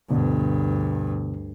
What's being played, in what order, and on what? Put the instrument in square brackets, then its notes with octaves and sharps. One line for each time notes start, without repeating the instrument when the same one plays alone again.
[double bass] D2 G2 [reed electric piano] B2 D3 B3